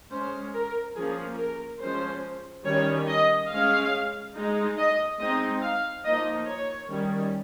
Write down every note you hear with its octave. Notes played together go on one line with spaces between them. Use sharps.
G#3 C#4 C5
A#4
F3 A#3 C#4 G#4
A#4
F3 G#3 C#4 C5
D#3 G3 C#4 C#5
D#5
G#3 C#4 F5
G#3 D#4
D#5
G#3 C4 D#4 D#5
F5
F3 A#3 D#4 D#5
C#5
D#3 G3 C#4